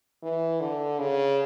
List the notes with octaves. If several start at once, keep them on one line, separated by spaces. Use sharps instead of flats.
E3
D3
C#3